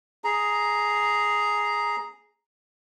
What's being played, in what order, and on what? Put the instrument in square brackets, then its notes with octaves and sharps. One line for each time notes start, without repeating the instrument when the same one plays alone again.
[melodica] G#4 A#5